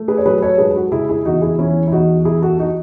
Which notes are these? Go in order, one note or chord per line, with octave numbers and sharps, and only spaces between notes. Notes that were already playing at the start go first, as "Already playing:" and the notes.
Already playing: A3
G#4 B4
C#5
F#3 G#4 B4
A4 C#5
G#2 G#4 B4
G#4
F#4 A4
C#3 E4 G#4
E4 G#4
E2 D#4 F#4
E4 G#4
E3 C#4 E4
E4
E2 D#4 F#4
E3 E4 G#4
F#4 A4
D#4 F#4